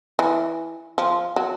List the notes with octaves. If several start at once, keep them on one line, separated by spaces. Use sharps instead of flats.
E3
F3
F#3